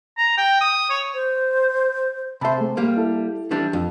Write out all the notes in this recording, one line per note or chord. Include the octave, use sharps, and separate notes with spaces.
A#5
G5
D#6
C#5
C5
C3 C5 E5 A5 B5
A3 G#4
G3 A#3
E4 A4
E3 G3 D4
F2